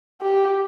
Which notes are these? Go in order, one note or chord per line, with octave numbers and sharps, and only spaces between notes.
G4